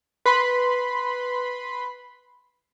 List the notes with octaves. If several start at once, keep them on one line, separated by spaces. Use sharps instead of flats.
B4 B5 C6